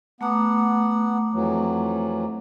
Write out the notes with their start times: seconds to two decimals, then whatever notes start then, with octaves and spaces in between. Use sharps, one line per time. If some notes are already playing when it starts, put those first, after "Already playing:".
0.21 A3 B3 F#5 A#5 D6
1.33 F2 E3 F#3